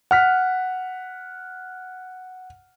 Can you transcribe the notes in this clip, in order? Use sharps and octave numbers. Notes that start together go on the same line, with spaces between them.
F#5 F6 B6